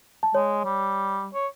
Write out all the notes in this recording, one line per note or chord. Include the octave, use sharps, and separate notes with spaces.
A5
G#3 C#5
G3
C#5